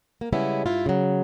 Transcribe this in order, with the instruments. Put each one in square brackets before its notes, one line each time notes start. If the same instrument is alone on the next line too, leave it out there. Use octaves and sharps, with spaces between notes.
[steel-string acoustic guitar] A#3
C#3 G3 G#3 B3 C#4 E4
G2 E4 F4
C#3 F#3